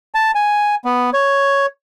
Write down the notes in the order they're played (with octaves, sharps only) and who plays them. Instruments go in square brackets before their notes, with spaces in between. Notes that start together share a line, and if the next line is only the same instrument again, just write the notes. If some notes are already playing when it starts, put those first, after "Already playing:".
[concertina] A5
G#5
B3
C#5